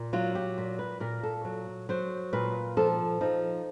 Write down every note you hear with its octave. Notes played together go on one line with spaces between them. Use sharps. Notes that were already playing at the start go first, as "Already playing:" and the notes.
Already playing: A#2
F#3 F4
G4
A#2
B4
A#2 A#4
A4
F#3
F#3 C5
A#2 B4
F3 A4
F3 D#4